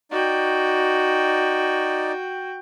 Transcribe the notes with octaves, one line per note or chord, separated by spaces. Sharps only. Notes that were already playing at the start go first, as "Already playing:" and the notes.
D#4 F#4 D5 G5